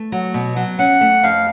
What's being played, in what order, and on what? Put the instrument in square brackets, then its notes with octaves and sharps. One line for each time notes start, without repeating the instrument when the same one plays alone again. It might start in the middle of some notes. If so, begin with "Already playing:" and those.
Already playing: [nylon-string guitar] A3
F#3
B2
F#3
[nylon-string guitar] C#4 [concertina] F#5
[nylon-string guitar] A3
[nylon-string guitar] F2 [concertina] F5